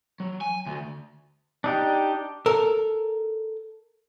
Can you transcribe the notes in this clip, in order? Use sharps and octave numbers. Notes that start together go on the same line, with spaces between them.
F#3
G#5
D2
D4 D#4 G4
A4 A#4